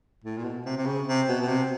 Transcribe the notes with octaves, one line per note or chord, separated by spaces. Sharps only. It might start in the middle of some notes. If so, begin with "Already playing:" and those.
A2
A#2
B2
C3
C3
C#3
C3
B2
B2
C3